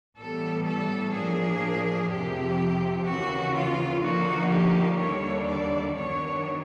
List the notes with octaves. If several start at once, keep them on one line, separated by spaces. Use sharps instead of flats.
A2 E3 G3 B3 A4
A4
A2 F3 A#3 D4 G#4
F2 C3 F3 G4
D#2 C#3 E3 F#4
F4
D3 F3 A#3 D#4 F#4
G4
D#2 D3 G3 A#3 D4 C#5
D5
F#2 D#3 F#3 B3 D4 C#5